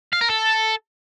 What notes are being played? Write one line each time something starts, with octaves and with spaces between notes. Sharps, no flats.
F5
A#4
A4